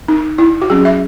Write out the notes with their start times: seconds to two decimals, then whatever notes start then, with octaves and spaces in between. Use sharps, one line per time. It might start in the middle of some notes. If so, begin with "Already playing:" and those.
0.08 D#4
0.38 E4
0.62 F#4
0.70 F#3 C#4 G#4
0.85 E5